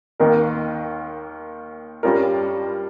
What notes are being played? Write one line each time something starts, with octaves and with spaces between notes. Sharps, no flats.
D#2 D#3 A#3 D#4 A#4
G2 G3 C#4 F4 A#4